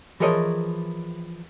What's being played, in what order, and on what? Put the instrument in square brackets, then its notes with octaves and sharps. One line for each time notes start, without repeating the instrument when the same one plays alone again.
[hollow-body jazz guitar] E3 F3 G#4 A#4 C#5 D#5